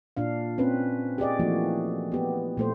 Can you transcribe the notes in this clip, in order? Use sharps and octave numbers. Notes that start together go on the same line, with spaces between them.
A#2 D4 F5
C4 C#4 B4
G4 G#4 D5 D#5
E3 F3 A3 A#3 F#4
B3 G4
A#2 A3 C5